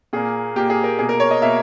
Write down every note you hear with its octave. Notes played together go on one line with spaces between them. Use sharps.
A#2 A#3 G#4
A#2 A#3 G4
G#4
A#4
B2 A#3 G#4
A#4
C#5
D#5
B2 A#3 E5